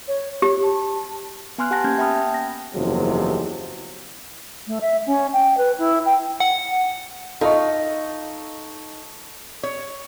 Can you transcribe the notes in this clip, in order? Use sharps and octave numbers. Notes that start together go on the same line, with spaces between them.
C#5
G4 C#5
A5
B3 G#5 C6 F6 F#6
G4 F#5 G#5 A5 F#6 A#6
A#3 C#4 F6 G6 G#6
E5 G5 A5 B5 D#6 F6
G5
A#6
F#1 E2 G#2 C3 F3 F#3
A3
E5
C#4
G5
B4
E4
G5
F#5
D#4 F4 A4 D#5 C#6
C#5